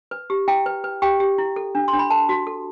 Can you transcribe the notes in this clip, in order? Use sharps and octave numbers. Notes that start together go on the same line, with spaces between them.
B4
G4
E4 G5
B4
B4
G4 G5
G4
E4
A4
D4
C6
D4
B5
A4 A5
F#4
A4